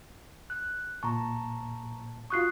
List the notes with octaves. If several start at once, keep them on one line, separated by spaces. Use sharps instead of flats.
F#6
A#2 A5 A#5 C#6
F4 F#4 C#6 D#6 F#6 C7